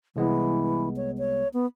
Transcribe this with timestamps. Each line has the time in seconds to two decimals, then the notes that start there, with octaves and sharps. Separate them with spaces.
0.16 C2 E3 G#3 B3
0.97 C#5
1.18 C#5
1.54 B3